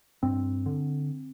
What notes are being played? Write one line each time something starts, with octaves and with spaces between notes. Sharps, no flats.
G2 C4
D3